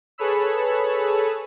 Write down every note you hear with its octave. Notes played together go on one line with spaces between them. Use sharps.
G#4 A4 B4 C#5 B5 E6